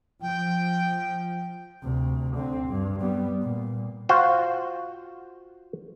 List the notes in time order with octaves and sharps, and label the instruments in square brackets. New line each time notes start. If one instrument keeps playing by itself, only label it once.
[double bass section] F3 [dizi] G5
[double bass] D2 C3
D3 C4
G2
G3 B3
A#2
[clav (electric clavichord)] F4 F#4 C5